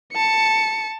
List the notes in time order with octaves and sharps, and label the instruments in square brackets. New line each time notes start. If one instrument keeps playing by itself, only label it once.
[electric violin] A5 C#7